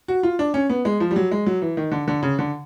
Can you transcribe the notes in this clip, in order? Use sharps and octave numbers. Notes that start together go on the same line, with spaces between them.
F#4
F4
D4
C#4
B3
G#3
F3
G3
F#3
G#3
F#3
E3
D#3
D3
D3
C#3
D3